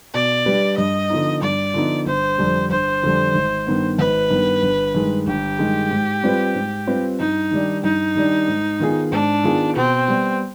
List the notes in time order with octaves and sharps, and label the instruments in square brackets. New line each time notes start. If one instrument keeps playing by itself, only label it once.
[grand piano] B2 [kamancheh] D5
[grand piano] G3 D4 G4 B4
[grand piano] G2 [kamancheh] D#5
[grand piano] D3 F3 B3 D#4
[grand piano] G2 [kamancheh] D5
[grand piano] D3 F3 B3 D#4
[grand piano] G1 [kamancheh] C5
[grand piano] F2 D3 G3
[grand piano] G1 [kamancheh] C5
[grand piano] F2 D3 G3
G#1
G2 D#3 B3
[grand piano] G#1 [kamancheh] B4
[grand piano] G2 D#3 B3
G1
G2 D#3 G#3
[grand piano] G1 [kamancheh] G4
[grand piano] G2 D#3 G#3
G#2
G3 C4 F4 B4
G#2
G3 C4 F4 B4
[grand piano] G2 [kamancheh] D#4
[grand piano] D#3 G3 D4
[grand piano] G2 [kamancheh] D#4
[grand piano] D#3 G3 D4
G#2
D#3 B3 F4 G#4
[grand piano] G#2 [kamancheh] D4
[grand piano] D#3 B3 F4 G#4
[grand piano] B2 [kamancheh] C4
[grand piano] G3 B3